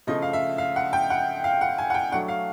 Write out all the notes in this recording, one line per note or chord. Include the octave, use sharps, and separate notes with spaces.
C#3 F3 A3 D#5
F5
E5
F5
F#5
G5
F#5
F5
F#5
G#5
F#5
G5
F#3 A3 D4 F#5
F5